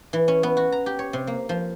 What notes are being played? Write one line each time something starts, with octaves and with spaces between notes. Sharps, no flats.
E3
C#4
B3
F#4
A#5
G4
C#5
C3
A#3
F3